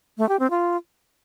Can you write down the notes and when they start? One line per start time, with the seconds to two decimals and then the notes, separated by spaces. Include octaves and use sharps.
0.18 A3
0.29 G4
0.40 C4
0.50 F4